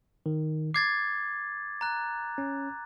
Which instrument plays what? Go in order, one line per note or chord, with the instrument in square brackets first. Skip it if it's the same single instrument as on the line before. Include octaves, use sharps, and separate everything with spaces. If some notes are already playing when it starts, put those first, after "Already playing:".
[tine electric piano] D#3
[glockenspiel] D6 G#6 A6 [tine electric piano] C7
[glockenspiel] A#5 F#6
[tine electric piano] C#4